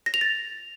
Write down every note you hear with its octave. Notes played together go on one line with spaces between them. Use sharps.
A#6
F7
A6